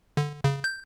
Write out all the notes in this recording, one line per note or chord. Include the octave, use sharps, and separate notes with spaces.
D3
C#3
G6